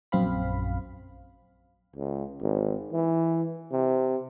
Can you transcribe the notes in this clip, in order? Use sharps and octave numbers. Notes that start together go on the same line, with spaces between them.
A#1 F#2 C4 F5 B5
C#2
G#1
E3
C3